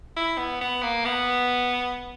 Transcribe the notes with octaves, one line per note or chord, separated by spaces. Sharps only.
E4
B3
B3
A#3
B3